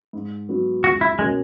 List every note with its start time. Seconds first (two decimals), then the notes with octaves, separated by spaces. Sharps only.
0.13 G#2
0.49 F#3 B3 F#4
0.84 C#2 F#4
1.01 E4
1.19 B2 G#3 A#3 C#4